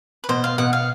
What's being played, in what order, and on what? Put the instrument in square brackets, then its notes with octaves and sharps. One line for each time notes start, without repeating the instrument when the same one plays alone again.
[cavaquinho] B4
[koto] B2 [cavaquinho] C5
[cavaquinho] F5
[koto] B2 [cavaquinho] F#5
[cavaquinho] F5